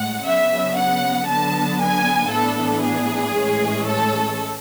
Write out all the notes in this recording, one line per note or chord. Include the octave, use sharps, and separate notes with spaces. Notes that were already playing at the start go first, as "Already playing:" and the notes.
Already playing: A2 G#3 F#5
C#3 F#3 B3 D4 E5
F#5
D3 F#3 B3 A5
G#5
A2 E3 B3 D4 A4
G#4
A2 E3 G#3 C#4
A4